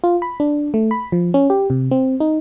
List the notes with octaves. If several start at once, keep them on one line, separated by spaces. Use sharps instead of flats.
F4
B5
D4
A3
B5
F3
C#4
G4
C3
C4
D#4